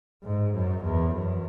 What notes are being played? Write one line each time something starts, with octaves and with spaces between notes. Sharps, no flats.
G#2
F#2
E2
F#2